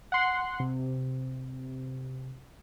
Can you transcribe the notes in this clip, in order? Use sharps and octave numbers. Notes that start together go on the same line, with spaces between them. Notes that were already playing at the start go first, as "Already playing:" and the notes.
F#5 C6
C3